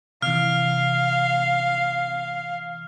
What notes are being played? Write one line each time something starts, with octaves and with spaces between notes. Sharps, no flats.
C3 E3 F5 F6